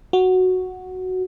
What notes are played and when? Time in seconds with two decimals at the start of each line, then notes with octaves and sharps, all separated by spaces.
0.13 F#4